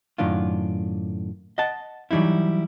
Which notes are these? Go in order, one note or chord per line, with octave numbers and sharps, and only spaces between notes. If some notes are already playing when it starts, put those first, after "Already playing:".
F#2 A2 D#3 D4 F4
D#5 F#5 A5
E3 F#3 G3 D#4 E4